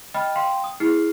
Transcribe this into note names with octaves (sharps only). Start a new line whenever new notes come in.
D#5 G5 B5 F6
F5 G5 C6
D#6
E4 G#4 F6 C7